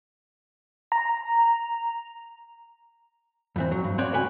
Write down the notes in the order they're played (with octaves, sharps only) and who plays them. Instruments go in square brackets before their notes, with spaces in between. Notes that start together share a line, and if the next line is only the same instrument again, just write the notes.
[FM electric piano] A#5
[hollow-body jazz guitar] F2 E3 C4
F#3
G2
C4 C#4 F#4 B4 C#5 D5
C#2 F#4 B4 G5 G#5